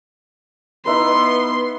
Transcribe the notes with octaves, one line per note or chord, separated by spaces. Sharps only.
B3 D#4 E4 B4 C6